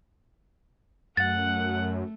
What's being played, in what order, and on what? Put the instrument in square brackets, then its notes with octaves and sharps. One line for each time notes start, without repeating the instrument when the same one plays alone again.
[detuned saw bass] F#2 [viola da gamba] A3 [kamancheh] F#5 [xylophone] A6